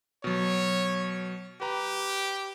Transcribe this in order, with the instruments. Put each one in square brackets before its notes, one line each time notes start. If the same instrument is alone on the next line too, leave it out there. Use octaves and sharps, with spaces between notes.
[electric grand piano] B2 F#3 [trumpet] C#5
[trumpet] G4 [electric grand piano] B4 A#5